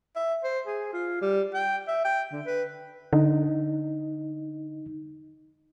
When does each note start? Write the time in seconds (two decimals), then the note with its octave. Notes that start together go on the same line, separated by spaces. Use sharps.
0.16 E5
0.43 C5
0.67 G#4
0.93 F4
1.21 G3
1.54 G5
1.87 E5
2.05 G5
2.32 D3
2.46 B4
3.13 D3 D#4